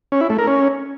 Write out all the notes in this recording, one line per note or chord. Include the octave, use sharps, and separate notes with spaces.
C#4
E4
A3
A#4
C#4